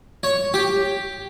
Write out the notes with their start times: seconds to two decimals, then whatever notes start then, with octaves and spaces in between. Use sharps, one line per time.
0.23 C#5
0.54 G4